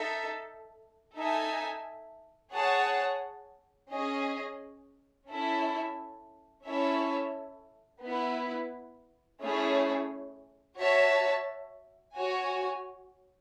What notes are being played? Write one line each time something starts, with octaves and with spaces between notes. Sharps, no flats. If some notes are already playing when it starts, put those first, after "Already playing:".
Already playing: D#4 A4 E5
D#4 A4 E5 G#5
G#4 C#5 F#5 A5
C#4 G#4 D#5
C#4 E4 A4 E5
C#4 E4 A4 C#5 E5
B3 E4 B4
A3 C#4 E4 G#4 C#5
F#4 C#5 E5 A5
F#4 C#5 G#5